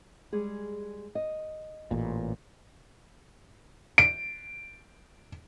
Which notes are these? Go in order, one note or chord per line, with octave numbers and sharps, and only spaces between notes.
G3 G#3 G#4
D#5
A1 A#2
D7